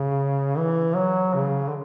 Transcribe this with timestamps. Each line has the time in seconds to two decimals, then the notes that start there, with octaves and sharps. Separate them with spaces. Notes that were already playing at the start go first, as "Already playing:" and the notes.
Already playing: C#3
0.58 E3
0.96 F#3
1.35 C#3
1.68 D3